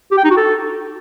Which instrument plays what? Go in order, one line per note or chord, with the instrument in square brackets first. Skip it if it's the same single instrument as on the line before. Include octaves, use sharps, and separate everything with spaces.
[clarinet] G4
G5
D#4
F#4
A4